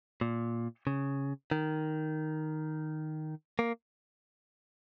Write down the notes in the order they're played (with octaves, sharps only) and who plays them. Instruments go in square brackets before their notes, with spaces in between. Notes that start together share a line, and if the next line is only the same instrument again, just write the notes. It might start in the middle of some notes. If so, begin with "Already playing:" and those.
[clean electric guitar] A#2
C#3
D#3
A#3